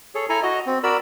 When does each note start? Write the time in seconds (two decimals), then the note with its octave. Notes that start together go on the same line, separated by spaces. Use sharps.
0.15 G#4 A4 C#5
0.29 E4 A4 G#5 A#5
0.43 F#4 D#5
0.66 C4
0.83 F#4 A#4 D5 B5 E6